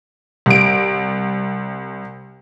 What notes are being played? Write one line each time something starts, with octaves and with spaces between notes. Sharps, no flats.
C2 D7